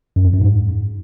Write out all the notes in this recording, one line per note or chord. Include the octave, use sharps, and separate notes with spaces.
F#2
F2
F#2
G#2